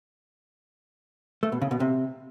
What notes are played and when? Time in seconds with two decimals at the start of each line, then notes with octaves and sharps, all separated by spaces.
1.43 A3
1.52 B2
1.62 C#3
1.71 B2
1.80 C3